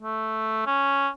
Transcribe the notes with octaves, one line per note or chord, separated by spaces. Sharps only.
A3
C#4